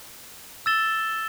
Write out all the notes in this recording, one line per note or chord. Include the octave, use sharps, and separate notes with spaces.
E6 A6 E7 G7